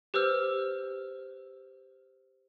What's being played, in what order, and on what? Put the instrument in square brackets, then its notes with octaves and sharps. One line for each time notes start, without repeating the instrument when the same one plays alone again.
[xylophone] G4 B4 C5 E6 F6